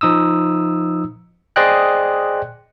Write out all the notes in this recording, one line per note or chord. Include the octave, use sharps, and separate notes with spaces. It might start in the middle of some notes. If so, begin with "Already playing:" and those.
F3 D#4 D#6 E6
G#4 C5 D5 D#5 G5 F#6